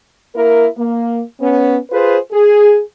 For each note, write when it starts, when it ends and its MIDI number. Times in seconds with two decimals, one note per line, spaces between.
0.35 0.67 58
0.35 0.67 64
0.35 0.67 70
0.77 1.21 58
1.40 1.77 59
1.40 1.77 61
1.91 2.17 65
1.91 2.17 68
1.91 2.17 71
1.91 2.17 72
2.31 2.80 68